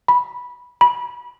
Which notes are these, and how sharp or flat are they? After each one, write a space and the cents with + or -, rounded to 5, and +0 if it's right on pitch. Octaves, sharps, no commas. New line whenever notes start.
B5 -10
B5 -25